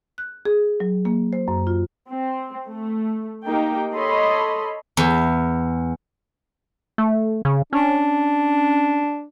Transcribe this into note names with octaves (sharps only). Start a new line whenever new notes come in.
F#6
G#4
F#3
A#3
C5
F#2
F4
C4
A3
A#3 D#4 G4 G5
A4 C#5 D#5 B5 C6
E2
A3
C#3
C#4 D4